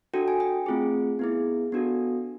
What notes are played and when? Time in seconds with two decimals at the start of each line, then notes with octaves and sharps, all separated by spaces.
0.14 D4 F#4 A4 G5
0.28 G#5
0.40 G5
0.66 A3 C4 F4 G#4
1.19 B3 E4 G#4
1.72 B3 D4 F#4 A4